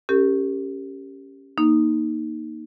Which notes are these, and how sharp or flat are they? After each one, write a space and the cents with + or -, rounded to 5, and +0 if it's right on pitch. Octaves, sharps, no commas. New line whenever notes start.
C#4 -5 G4 +0 A#4 -35
A#3 +10 D#4 +0